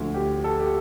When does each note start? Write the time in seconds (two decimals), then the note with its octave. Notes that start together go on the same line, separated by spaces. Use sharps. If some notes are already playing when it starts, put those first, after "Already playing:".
Already playing: D2 D3 F3
0.14 G4
0.44 A4
0.60 G4